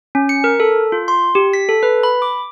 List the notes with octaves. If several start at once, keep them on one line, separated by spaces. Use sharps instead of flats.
C#4
C#7
A#4
A4
F4
C6
G4
B6
A4
B4
B5
D6